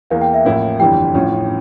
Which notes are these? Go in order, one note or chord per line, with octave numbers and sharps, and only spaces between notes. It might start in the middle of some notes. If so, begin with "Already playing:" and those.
E2 E3 A#3 F5
G5
E5
A1 A2 F3 A#3 E4
G1 F2 E3 G3 G5
A1 A2 F3 C#4